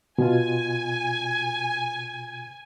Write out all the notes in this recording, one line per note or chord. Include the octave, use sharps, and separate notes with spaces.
B2 F4 G#5